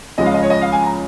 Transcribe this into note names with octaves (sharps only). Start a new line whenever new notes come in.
C#2 C#3 F3 G#3 D#5
F5
D#5
C#5
D#5
F5
G#5
A#5